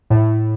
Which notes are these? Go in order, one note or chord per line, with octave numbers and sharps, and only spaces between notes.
A2